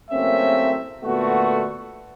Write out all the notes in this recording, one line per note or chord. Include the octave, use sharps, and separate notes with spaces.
F#1 A3 A#3 C4 C#4 E5
A#2 D3 A3 B3 F#4